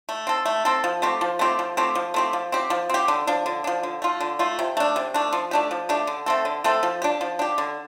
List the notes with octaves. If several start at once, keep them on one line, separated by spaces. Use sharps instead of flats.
A3
C4 A4
A3
C4 A4
F3
A3 C4 G4
F3
A3 C4 G4
F3
A3 C4 G4
F3
A3 C4 G4
F3
C4 G4
F3
C4 G4
D3
F3 D4
D3
F3 D4
D3
A3 F4
D3
A3 F4
C3
A3 D4
C3
A3 D4
F3
A3 D4 G4
F3
A3 D4 G4
D3
A3 C4 A4
D3
A3 C4 A4
F3
D4 G4
F3
D4 G4
D3